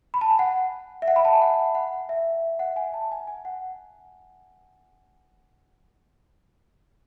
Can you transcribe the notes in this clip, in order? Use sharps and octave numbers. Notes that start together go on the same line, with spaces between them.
B5
A5
G#5
F#5
E5
F#5
B5
A5
G#5
F#5
F#5
E5
F#5
G#5
A5
G#5
G#5
F#5